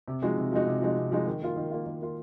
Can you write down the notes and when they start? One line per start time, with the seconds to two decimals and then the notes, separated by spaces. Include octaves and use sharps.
0.08 C3
0.22 F3 G#3 D#4 F#4
0.38 C3
0.52 F3 G#3 D#4 F#4
0.67 C3
0.82 F3 G#3 D#4 F#4
0.97 C3
1.12 F3 G#3 D#4 F#4
1.27 D#3
1.42 A#3 F4
1.57 D#3
1.71 A#3 F4
1.86 D#3
2.01 A#3 F4